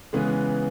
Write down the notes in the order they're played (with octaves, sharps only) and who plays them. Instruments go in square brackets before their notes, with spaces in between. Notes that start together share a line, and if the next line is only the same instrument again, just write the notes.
[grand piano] C#3 E3 G#3 B3 B4